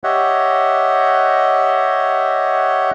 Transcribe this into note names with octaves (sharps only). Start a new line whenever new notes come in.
G4 C#5 D#5 E5 F#5